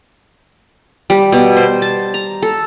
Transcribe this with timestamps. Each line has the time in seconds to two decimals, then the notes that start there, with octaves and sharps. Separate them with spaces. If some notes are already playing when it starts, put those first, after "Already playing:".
1.10 G3
1.32 B2
1.56 C5
1.82 A5
2.14 A#5
2.42 A4